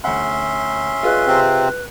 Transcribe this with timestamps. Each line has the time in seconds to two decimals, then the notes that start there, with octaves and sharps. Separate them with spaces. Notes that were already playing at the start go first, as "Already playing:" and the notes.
0.04 D2 C#4 E5 F#5 C6
1.03 F4 G#4 B4 D#5
1.27 C3 C4